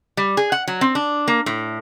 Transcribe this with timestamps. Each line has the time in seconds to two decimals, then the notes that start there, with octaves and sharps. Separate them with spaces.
0.17 G3
0.37 G#4
0.52 F#5
0.68 F#3
0.81 C4
0.95 D4
1.28 A#3
1.46 A2